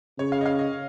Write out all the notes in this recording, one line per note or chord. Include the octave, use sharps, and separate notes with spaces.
C#3 C#5
F5
D#5
F5
D#5